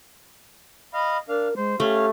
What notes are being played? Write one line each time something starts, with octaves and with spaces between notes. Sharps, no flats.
D#5 F5 B5
D4 A#4 F5
G#3 C5
A3 C#4 G4 F5